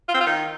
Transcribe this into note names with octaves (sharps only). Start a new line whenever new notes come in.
F4
C4
F4
D#3